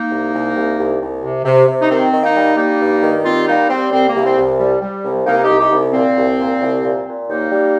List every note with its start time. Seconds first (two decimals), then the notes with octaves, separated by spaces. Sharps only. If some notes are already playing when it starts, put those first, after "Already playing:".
Already playing: A#3 D#4
0.10 C2
0.32 C2
0.55 C2
0.77 C2
1.00 C2
1.22 C3
1.44 C3
1.67 C3
1.82 D#4
1.89 D#3 C4
2.12 D#3
2.23 A#3 D#4
2.34 G3
2.57 G3 A#3 D#4
2.80 G2
3.02 D#3
3.24 G3 C4 F4
3.47 G3 A#3 D#4
3.69 G3 C4
3.91 C2 C4
4.08 A#3
4.14 C2
4.25 C4
4.37 C2
4.59 G3
4.81 G3
5.04 C2
5.26 C2 A#3 D#4
5.43 D#4 G4
5.49 C2
5.60 D#4 G4
5.71 C2
5.93 A#2 C4
6.16 C2
6.39 A#2
6.61 C2
6.83 A#2
7.06 A#2
7.28 D#2 A#3 D#4
7.51 G3